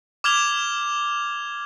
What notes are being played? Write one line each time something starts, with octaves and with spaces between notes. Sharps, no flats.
D6 F6 G#6 F7 G7